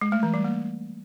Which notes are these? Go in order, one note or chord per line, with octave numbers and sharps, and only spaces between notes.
G#3
A3
E3
G3
A#3